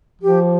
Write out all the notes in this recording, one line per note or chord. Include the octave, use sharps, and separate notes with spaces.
F3 G4